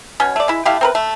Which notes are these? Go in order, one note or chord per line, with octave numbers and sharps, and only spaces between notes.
B2 C#4 C#5
A3 D5
G#3 E4
A3 E4 G4 F5
C4 A#4 B4
A3